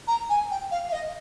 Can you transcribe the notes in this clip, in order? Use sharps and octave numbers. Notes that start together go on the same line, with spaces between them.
A#5
G#5
G5
F5
F5
D#5